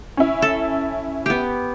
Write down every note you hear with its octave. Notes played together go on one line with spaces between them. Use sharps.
C#4 E4
A4
B3 G4